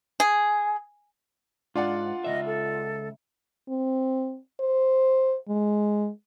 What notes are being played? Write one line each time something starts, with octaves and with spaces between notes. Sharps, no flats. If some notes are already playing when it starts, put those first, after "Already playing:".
G#4
G#2 D4 F4 D5 F#5
C#2 C3 D#5 E5
A4
C4
C5
G#3